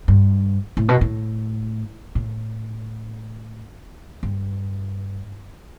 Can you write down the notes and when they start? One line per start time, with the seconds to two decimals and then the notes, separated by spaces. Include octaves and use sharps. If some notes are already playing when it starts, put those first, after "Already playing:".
0.08 G2
0.77 A2
0.89 B2
1.01 A2
2.15 A2
4.23 G2